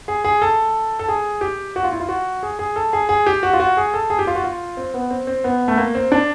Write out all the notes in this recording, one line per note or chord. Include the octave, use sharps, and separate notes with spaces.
G#4
G#4
A4
A4
G#4
G4
F#4
F4
E4
F4
F#4
G#4
G#4
A4
G#4
G#4
G4
F#4
F4
F#4
G#4
A4
G#4
G4
F4
F#4
F4
C4
B3
C4
C4
B3
A3
A#3
C4
D4